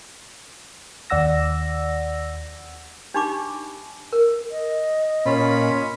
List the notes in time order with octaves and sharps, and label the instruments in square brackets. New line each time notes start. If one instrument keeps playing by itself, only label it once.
[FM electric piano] D#2 D5 F#5 E6 A#6
[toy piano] D4 D#4 G4 B5 C#6 D6
A#4
[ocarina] D#5
[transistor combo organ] A#2 [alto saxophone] C#4 [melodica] F4 B5